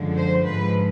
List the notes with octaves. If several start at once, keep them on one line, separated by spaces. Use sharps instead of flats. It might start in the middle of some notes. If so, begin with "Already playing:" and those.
Already playing: F#2 D3 F3 G#3
C5
G#2 F3 G#3 B4